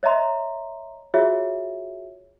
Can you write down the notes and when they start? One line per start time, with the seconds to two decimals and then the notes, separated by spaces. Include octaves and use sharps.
0.03 C#5 D#5 E5 A#5 C6
1.14 F4 F#4 G#4 C#5 E5